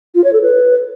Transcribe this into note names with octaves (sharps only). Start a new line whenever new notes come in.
F4
C#5
A4
B4